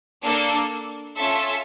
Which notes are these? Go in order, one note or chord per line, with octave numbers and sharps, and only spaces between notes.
A#3 D4 A4
C#4 F4 A4 E5